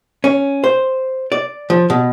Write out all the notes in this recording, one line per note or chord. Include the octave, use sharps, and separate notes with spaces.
C#4
C5
D5
F3
B2